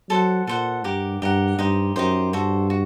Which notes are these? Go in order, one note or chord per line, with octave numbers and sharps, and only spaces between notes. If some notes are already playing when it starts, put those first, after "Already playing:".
F#3 A4 C5 F#5
A#2 A4 C5 F#5
G2 G4 A#4 F#5
G2 G4 A#4 F#5
G2 D#4 G4 C5
F#2 D#4 G4 C5
G2 F#4 A4 C5
F#4